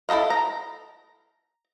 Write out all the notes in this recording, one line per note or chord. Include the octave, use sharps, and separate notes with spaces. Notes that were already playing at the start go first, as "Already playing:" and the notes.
E4 A4 A#4 D#5 F5
A#5